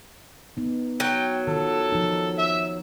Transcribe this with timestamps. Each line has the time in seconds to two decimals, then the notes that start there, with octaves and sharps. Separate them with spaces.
0.57 B3 D#4
1.00 F#3 G5
1.47 D#3 F4 A4
1.93 F3 D#4
2.38 E5